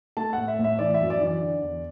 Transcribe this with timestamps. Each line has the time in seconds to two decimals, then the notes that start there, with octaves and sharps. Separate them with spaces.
0.17 A3 A5
0.33 A2 F#5
0.48 E5
0.59 A2
0.64 E5
0.79 E3 D5
0.94 E5
1.01 F#2
1.10 D5
1.20 E3
1.26 D5
1.41 D3
1.62 E2